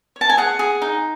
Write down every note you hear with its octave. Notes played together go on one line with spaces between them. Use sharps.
C#5
A5
G#5
G#4 F#5
G#4
D#4